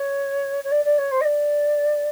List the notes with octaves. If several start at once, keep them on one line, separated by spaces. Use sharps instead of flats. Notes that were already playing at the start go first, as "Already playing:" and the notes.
Already playing: C#5
C#5
D5
D5
C#5
C5
D#5
D5